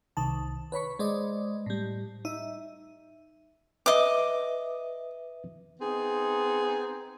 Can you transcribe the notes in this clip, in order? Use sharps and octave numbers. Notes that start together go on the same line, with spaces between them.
C2 D#3 A5
B4 C#5 B5 C#6
G#3 C5 D5 D#5
A2 G3
D#4 E5
B4 D#5 E5 D6
B3 C4 D#4 G#4